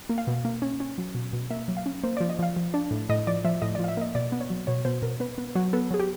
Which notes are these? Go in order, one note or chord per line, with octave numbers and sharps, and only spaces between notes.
A#3
F5
B2
A#3
C#4
C#4
F#3
B2
B2
A#3 E5
F#3
F5
C#4
A#3 C5
D5
F3
D#5
F3 F5
F3
D4
A2
A2 D#5
F3 D5
F3 E5
A2 D#5
D5
F3
F5
E5
A#3 D#5
B2 D5
B3
C#5
F#3
B2 C#5
B2 C5
B2 A#4
B3 B4
B3
F#3
B3 A4
F#3 G#4
G4